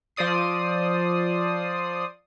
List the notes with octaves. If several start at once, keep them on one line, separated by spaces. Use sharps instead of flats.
F3 C5 D5 D#6 C7